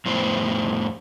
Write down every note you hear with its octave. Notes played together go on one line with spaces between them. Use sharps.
F2 A2 B3 C5